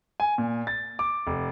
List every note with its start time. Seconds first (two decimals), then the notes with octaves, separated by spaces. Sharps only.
0.20 G#5
0.38 A#2
0.67 A6
0.99 D6
1.27 F1